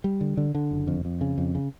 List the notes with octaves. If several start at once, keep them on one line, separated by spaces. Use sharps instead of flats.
G3
D3
D3
D3
F#1
F2
F2
C#3
F2
C#3